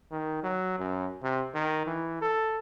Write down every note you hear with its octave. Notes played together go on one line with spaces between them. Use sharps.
D#3
F#3
F#2
C3
D#3
E3
A4